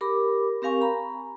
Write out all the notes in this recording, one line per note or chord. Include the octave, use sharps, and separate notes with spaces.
G4 A#4 B5 D6
C4 G4 A#4 F5 G#5 C#6
A#5 B5